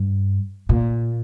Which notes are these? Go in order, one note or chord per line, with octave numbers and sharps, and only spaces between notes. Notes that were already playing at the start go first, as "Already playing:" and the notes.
Already playing: G2
A#2